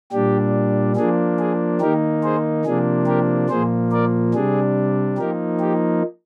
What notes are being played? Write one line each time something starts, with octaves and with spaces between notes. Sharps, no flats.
A#2 G3 D4 G4
F3 A#3 D4 G#4
G#4
D#3 A#3 D#4 G4 A#4
G#4 C5
C3 F3 A#3 D4 G#4
G4 A#4
A#2 F3 A#3 G#4 C5
A#4 D5
C3 G3 D4 G#4
F3 A#3 D#4 G4 A#4
G4